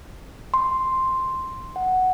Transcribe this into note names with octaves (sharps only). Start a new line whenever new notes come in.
C6
F#5